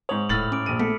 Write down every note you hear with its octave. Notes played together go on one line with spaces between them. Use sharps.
G#2 C#5 D#6 F7 F#7
D#1 A2 B5 E6 F6 A6 F#7
C#4 D6 D7
A#1 D#7
A3 B3 B6 C#7